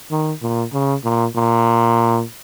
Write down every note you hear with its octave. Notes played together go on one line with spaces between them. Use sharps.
D#3
A#2
C#3
A#2
A#2